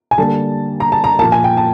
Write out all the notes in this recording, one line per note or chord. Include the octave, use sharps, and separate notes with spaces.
G#5
D3 G3 A#3 D4 A5
A#5
A5
A#5
A#2 F3 A#3 A5
G#5
G5
A5